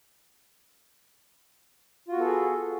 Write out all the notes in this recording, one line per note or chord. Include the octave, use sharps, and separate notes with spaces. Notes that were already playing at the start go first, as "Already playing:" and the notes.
B3 F4 F#4 G#4 A4